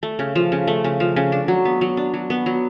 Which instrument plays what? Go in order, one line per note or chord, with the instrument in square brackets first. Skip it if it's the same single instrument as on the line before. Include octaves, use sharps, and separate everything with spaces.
[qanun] A3
C#3
F3
C#3
A3
C#3
F3
C#3
D4
F#3
B3
F#3
D4
F#3
B3
F#3